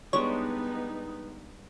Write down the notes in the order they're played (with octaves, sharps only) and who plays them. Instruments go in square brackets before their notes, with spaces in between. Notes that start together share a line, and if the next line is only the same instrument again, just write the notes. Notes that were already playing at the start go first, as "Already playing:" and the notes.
[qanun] G3 G#3 D4 [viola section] B3 D#4 [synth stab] C#5